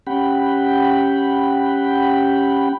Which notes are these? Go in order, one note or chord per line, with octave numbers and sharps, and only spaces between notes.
C#4 G4 F#5 G5 B5